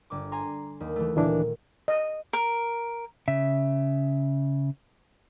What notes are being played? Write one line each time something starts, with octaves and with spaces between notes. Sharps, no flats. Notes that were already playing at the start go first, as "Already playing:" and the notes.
G1 D6
G#5 A#5 C6
D#2
E3 A3
D2 A#2 D#3 E3 D4
D#5
A#4
C#3 E5